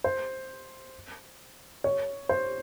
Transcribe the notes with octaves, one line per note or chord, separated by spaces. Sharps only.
C5
C#5
C5